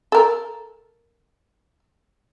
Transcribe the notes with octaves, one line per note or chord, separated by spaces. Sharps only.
A4 A#4